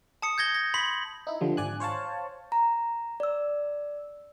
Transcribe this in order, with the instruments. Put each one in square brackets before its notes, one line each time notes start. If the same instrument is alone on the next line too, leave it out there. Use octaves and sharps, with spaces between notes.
[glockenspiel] A5 D#6 C#7
G6 G#6 A#6 G7
A#6
B5 C6 B6 F#7
[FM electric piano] D#4 E4
D3 F3 G3
G#1 D5 G#5 F#6
C5 C#5 F5 A5
[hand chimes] A#5
D5 E6